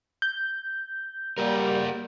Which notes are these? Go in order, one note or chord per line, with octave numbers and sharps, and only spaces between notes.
G6
G3 A#3 F#4 A#4